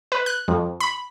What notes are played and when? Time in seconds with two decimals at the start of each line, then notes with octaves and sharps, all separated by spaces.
0.12 B4
0.26 F#6
0.48 F2
0.80 B5